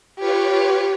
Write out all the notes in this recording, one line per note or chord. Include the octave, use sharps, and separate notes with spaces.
F4 G4 B4 C#5